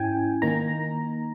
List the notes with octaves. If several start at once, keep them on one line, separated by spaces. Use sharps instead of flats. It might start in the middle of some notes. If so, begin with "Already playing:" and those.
Already playing: G#2 C#4 E4 G5 G#5
D#3 A#3 D#4 A#5